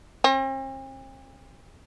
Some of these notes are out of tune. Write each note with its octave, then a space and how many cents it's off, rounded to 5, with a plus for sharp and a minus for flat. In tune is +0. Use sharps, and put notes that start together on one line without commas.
C4 +45